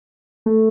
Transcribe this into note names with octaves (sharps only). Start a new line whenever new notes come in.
A3